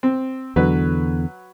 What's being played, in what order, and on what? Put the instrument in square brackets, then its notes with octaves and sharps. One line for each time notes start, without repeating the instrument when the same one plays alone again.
[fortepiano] C4
[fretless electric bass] E2 D3 [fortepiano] F#3 B4